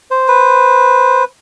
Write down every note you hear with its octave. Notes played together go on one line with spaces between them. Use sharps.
C5
B4